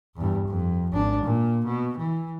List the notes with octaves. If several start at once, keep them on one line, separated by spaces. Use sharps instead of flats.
E2 G2
F2
G#1 D4
A#2
B2
E3